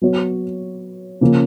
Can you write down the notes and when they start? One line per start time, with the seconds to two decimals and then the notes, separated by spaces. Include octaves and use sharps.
0.01 F#3 B3 F#4 C#5
1.21 C#3 F3 A#3 C#4